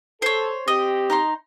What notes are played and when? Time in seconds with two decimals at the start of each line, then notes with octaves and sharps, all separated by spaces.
0.22 A4 C5 C#5
0.68 C4 G4 D#5
1.10 D#4 A#5 C6